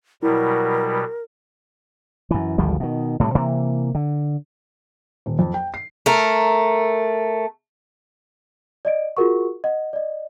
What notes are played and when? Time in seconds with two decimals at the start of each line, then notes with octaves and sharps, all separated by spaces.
0.23 B2 F#3 G3 E4 A#4
2.31 F#2 E3
2.58 G#1 D2 F3 G3
2.80 B2 D#3
3.20 A2 C3 F3 G3
3.35 C3 E3 A#3
3.95 D3
5.26 D#1
5.39 F2
5.54 G5
5.74 C7
6.06 A3 A#4
8.85 D5 D#5 D7
9.17 F4 F#4 G#4 A#4 F#5 C#6
9.64 D#5 F#5
9.93 D5 D#5